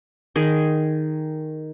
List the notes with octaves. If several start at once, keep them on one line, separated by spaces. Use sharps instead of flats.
D#3 G#4